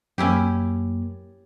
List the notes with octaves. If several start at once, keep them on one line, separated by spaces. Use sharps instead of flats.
F#2 A#3 C#4 E4 G4